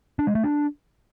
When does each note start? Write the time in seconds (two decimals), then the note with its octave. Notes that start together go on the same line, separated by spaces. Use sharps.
0.19 D4
0.27 G#3
0.35 A3
0.43 D4